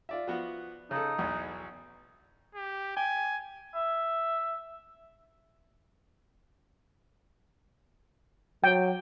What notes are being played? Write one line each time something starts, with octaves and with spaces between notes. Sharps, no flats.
F4 D5 E5
F3 B3 F#4
C#3 D#4 A4
B1 E2
G4
G5 G#5
E5
F#3 G5